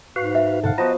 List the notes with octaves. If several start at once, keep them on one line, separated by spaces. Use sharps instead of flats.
G#2 F#4 B4 F5
E5
G2 B2 D3 F5 F#5 A5
F3 B3 F#4 D#5 A#5